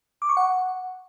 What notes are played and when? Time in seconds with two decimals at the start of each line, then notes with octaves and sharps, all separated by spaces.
0.22 D6
0.29 C#6
0.37 F#5